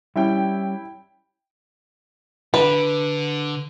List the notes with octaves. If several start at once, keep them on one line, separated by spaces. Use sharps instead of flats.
G3 C#4 E4 G5
D3 B4